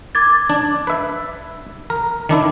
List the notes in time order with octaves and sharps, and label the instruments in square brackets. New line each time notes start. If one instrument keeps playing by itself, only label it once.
[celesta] D6 G#6 A6
[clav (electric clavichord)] D4
B4 E5
A#4
D#3 D4 E4